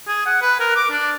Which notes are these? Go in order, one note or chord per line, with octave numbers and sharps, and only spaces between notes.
G#4
F#5
B4
A#4
D6
D4